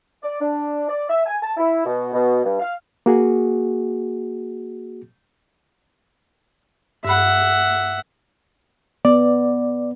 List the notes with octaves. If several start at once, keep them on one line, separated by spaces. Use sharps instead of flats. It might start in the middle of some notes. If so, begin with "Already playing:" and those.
D5
D4
D5
E5
G#5
A5
E4
B2
B2
G2
F5
A#3 F#4 G#4
G2 E5 F#5 B5
B3 D5